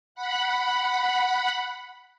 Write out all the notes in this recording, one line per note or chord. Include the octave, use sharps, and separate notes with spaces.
F#5 B5